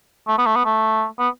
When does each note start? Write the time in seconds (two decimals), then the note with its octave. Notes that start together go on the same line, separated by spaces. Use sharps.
0.28 A3
0.38 B3
0.46 A3
0.56 B3
0.65 A3
1.19 B3